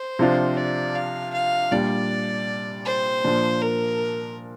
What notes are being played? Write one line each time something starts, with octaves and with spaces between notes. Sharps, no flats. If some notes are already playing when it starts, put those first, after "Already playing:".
Already playing: C5
C3 F3 D4 F4
D5
F5
F5
A#2 G3 D4 D5
C5
A#2 F3 D4
A#4